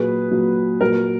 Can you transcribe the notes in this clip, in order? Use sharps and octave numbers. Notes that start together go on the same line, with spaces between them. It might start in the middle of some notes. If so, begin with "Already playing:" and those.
Already playing: A#2 F#3 G#4 B4
A#2 F#3
A#2 F#3 A#4